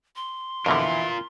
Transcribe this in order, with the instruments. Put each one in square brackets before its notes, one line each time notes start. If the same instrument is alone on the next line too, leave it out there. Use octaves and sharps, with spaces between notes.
[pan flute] C6
[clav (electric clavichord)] F2 B2 D3 [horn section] E3 [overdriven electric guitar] F4 A#4